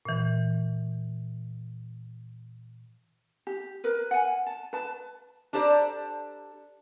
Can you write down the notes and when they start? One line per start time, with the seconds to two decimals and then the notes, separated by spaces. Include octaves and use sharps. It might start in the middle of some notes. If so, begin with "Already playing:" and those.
0.05 A#2 E3
3.47 G4
3.84 A#4 B4
4.11 F#5 G#5
4.46 A5
4.73 B4 A5
5.53 D4 G4 A4 C5 D5 A#5